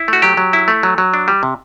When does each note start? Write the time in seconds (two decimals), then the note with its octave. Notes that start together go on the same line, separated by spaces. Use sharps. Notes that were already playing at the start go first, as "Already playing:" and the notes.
Already playing: E4
0.08 A3 F#4
0.22 F#3 G4
0.37 F#3
0.53 E4
0.68 A3
0.83 F#3
0.98 F#3
1.14 D4
1.28 G3
1.43 C3